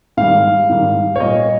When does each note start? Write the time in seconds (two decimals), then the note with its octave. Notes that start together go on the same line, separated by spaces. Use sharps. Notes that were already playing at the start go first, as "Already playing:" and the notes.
0.17 G#2 D#3 G3 F5
0.70 G#2 D#3 G3
1.16 C#5
1.20 A#2 G3 D#5